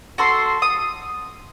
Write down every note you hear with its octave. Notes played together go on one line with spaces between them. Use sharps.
F#4 A4 C6
D#6